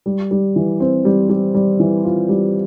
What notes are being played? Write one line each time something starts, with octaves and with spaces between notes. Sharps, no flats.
G3
G3
E3
C4
G3
G3
G3
E3
F4
G3